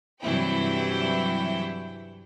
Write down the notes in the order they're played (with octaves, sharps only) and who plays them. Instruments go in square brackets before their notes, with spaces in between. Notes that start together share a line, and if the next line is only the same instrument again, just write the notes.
[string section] G2 C3 E3 F#3 E4 G5